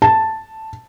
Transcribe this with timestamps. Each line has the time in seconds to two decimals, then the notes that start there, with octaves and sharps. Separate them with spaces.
0.02 A5